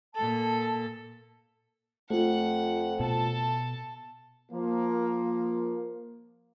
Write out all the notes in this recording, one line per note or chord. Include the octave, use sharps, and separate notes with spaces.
A#2 A4 A5
F2 A3 F4 F#5
B2 A4 A5
F3 A#3